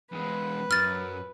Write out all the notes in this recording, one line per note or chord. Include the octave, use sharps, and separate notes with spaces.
E2 G#3 B4
F#2 F6 A6